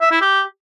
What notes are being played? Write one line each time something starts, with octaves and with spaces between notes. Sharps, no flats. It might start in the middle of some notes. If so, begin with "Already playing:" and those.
E5
E4
G4